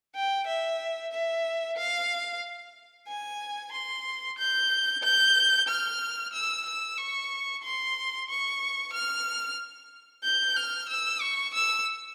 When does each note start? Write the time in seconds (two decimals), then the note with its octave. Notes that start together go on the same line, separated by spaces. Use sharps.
0.16 G5
0.47 E5
1.13 E5
1.77 F5
3.08 G#5
3.72 C6
4.38 G6
5.03 G6
5.68 F6
6.33 E6
6.66 E6
6.98 C#6
7.63 C6
8.29 C#6
8.93 F6
10.24 G6
10.56 F6
10.89 E6
11.21 C#6
11.54 E6